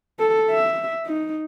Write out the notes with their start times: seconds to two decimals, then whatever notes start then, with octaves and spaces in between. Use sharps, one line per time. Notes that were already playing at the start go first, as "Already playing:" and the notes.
0.19 A4
0.50 E5
1.06 D#4